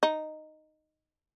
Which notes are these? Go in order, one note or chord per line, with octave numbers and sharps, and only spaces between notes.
D#4